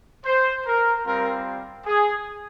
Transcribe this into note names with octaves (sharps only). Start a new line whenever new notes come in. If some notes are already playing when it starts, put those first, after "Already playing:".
C5
A#4
G3 C4 F4 A#4
G#4